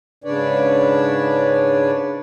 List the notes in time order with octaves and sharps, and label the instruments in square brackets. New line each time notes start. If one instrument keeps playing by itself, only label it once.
[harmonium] G#2 C#3 D4 B4 C#5 D5